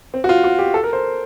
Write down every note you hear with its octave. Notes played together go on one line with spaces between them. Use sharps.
C4
F#4
F4
F#4
G4
A4
A#4
C5